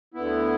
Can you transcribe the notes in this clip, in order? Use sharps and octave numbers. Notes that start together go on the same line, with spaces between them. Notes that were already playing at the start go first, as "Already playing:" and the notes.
D2 D3 B3 E4